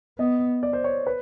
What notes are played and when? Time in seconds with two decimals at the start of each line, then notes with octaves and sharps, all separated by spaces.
0.19 B3 D#5
0.63 D5
0.73 C5
0.84 C#5
1.07 B4